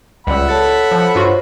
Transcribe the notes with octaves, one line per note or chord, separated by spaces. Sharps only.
C#2 G3 E5 F#5 B5
A4 C#5 A5
F3
G2 F4 F#4 C5 C#5